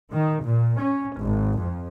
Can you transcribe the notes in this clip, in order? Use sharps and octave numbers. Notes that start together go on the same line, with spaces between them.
D#3
A#2
C#4
G#1
F2